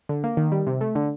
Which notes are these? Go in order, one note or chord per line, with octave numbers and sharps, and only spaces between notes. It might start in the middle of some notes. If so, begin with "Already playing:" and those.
D3
A#3
D#3
G3
C3
A3
D3